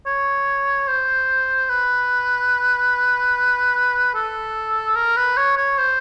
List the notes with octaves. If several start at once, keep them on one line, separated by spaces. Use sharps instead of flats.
C#5
C5
B4
A4
A#4
B4
C#5
C#5
C5